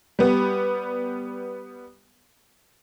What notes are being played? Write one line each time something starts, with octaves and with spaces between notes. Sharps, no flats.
G3 B3